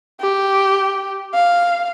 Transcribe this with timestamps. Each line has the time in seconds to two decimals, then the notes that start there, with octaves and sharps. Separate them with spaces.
0.21 G4
1.34 F5